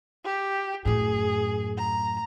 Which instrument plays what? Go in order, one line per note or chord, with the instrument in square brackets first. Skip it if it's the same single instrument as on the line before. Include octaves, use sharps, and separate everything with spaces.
[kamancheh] G4
[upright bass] F#2 A2 [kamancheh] G#4
[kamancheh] A#5